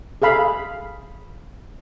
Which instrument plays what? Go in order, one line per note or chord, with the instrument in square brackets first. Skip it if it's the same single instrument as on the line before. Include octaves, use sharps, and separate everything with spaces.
[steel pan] G#4 A4 F5 B5